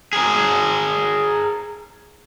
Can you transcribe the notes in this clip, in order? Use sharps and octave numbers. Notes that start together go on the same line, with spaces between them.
G#4 A#4